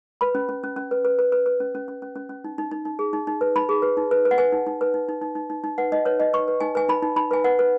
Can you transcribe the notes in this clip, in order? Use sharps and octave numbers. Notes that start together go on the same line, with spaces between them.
B4 B5
C#4
C#4
C#4
C#4
B4
B4
B4
B4
B4
C#4
C#4
C#4
C#4
C#4
C#4
D#4
D#4
D#4
D#4
G#4
D#4
D#4
B4
D#4 B5
G#4
B4
D#4
B4
B4
F#5
B4 G#5
D#4
D#4
B4
D#4
D#4
D#4
D#4
D#4
D#4
B4 F#5
D#4 D#5
B4 C#5
D#4 D#5
B4 C#6
B4
D#4 G#5
B4 G#5
D#4 B5
D#4
D#4 B5
B4 G#5
B4 F#5
B4